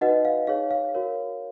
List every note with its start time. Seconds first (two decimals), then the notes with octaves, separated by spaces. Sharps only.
0.01 D#4 F#4 B4 D#5 F#5
0.25 F5
0.47 D#4 G#4 C#5 F5
0.71 F5
0.95 F#4 A#4 C#5